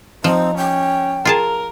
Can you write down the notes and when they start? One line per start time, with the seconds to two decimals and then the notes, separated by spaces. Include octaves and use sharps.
0.24 F3 C4 D#4
0.57 C#4 G5
1.25 F4 G#4 A#4 A5